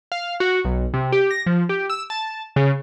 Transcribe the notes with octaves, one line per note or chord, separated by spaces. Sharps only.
F5
F#4
B1
C3
G4
A#6
F3
G4
E6
A5
C#3